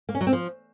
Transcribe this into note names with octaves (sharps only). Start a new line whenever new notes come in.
A#3
C#4
F#3
C4
F3